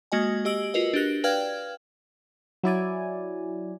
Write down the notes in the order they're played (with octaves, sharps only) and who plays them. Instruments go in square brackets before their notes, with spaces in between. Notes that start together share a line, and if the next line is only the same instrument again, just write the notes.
[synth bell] G#3 A#3 F#4 D#5 G#5
G4 D#5 E6 D7 F#7
F4 F#4 A#4 B4 D#5
D4 F#4 G4 F#6 A#6
B4 D5 F5 G5 F6 G#6
[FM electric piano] F#3 E4 D5 G#5